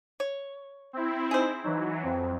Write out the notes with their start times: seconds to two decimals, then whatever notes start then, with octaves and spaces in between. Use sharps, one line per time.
0.20 C#5
0.93 C4 E4
1.31 D#4 G#4 C5
1.64 E3 F#3 D#4
2.03 F2 C4